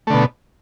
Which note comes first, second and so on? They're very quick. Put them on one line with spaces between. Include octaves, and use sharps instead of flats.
A3 D3 B2